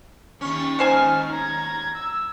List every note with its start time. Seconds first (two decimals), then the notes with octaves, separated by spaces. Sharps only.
0.41 D#2 C#4 C#6
0.79 G#3 D#4 C5 G#5 F6
1.31 A#5 G#6
1.95 E6